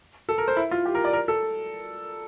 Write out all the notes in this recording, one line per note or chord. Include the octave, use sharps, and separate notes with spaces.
A4
A#4
C5
E4
F4
G4
A#4
D5
A#4
A4